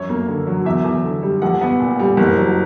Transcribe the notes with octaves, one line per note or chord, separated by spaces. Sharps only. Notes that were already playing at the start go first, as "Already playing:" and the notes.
Already playing: F#2 C#5
A#3
D3
F#3
E2 E5
E2
D3
G3
A#1 F#5
B3
A#2
G3
F#1
F#3